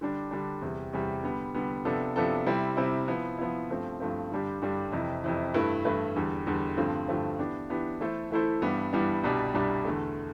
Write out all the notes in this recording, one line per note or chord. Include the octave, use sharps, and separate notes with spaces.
D3 G3 D4
D3 G3 D4
E2 C3 G3
E2 C3 G3
D3 G3 B3
D3 G3 B3
C3 F3 B3 D4 A4
C3 F3 B3 D4 A4
C3 G3 C4 E4
C3 G3 C4 E4
F3 B3 E4
F3 B3 E4
G2 F3 A3 C4
G2 F3 A3 C4
G2 D3 G3 D4 G4
G2 D3 G3 D4 G4
F2 C3 E3
F2 C3 E3
G2 E3 A3 E4 B4
G2 E3 A3 E4 B4
E2 D3 G3
E2 D3 G3
G2 D3 F3 A3 C4
G2 D3 F3 A3 C4
E3 B3 D4 G4
E3 B3 D4 G4
E3 A3 E4 A4 C5
E3 A3 E4 A4 C5
G2 E3 G3 B3 D4
G2 E3 G3 B3 D4
C2 B2 G3 D4
C2 B2 G3 D4
E2 D3 A3